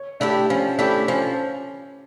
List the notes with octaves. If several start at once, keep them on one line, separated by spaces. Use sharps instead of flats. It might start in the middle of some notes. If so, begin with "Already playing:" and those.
Already playing: C#5
A3 D4 E4 G4
F3 C#4
A3 D4 E4 G4
F3 C#4